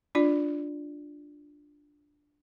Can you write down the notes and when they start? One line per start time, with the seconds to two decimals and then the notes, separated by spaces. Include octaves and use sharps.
0.15 D4 F4 D5